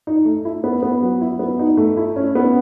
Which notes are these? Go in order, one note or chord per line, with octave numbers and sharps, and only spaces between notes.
D#4
A3
E4
B3
B3
F#3
E4
B3
D#4
A3
E4
C#4
B3